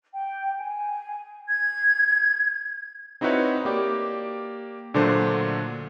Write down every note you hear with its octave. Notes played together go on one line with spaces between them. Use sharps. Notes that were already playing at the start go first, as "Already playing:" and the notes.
G5
G#5
G#6
C4 D#4 E4 F#4 B4 C#5
A#3 G4 D5
A#2 D3 F#3 A3 D4 C5